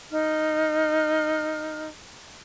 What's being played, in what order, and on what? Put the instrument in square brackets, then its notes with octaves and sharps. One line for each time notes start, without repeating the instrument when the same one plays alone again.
[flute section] D#4 F6